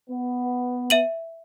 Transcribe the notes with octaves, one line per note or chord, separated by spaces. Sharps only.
B3
E5 D#7 F#7